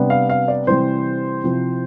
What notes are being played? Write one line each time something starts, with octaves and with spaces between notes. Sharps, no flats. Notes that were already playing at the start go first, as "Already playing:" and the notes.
Already playing: C3 G3 B3 D4
F5
F5
D5
C3 E3 G3 C4 C5
C3 F3 C4 E4